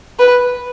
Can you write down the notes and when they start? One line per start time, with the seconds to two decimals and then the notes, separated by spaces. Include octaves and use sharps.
0.19 B4